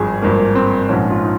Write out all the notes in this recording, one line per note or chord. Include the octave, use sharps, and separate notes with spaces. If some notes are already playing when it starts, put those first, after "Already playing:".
Already playing: G#1 G2 F3 G#4
G#1 G2 F3 A#3
C4
A#1 G#2 F3 C#4
F4
D#4